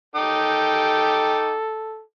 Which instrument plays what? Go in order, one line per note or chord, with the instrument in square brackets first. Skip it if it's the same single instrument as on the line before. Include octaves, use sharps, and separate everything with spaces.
[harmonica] D#4 G5 D6 [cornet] A4